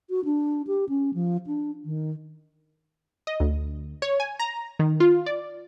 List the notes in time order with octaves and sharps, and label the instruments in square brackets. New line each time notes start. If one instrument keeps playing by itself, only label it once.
[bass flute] F#4
D4
G4
C#4
F3
D4
D#3
[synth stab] D#5
D2
C#5
G#5
A#5
D#3
F4
D5